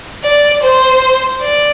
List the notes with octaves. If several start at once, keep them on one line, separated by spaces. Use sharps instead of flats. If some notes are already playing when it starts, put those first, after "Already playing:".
D5
C5
D5